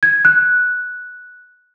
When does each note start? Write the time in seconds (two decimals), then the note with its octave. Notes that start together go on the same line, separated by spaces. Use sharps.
0.03 G#6
0.25 F#6